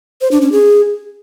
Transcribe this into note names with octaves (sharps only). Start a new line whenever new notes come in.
C5
D4
C#4
G#4